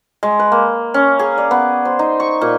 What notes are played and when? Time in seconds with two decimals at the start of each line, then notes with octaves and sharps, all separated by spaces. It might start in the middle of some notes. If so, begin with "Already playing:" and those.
0.23 G#3
0.39 B4
0.52 A#3
0.94 C#4
1.19 G#4
1.38 D5
1.51 B3
1.85 C5
1.99 D#4
2.20 C#6
2.41 A#2